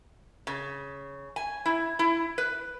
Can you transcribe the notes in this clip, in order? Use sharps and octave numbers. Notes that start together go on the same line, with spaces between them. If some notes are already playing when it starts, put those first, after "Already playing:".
C#3
G#5
E4
E4
B4